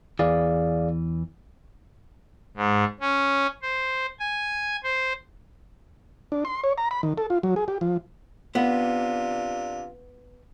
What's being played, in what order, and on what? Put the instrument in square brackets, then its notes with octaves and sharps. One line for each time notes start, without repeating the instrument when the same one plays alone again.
[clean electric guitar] E2 E3 [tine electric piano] G#4 D5 F5
[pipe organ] G#2
C#4
C5
G#5
C5
[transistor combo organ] D4
C6
C#5
A#5
B5
D#3
A4
F4
F#3
G#4
G4
F3
[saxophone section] C3 D4 F4 [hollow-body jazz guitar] B3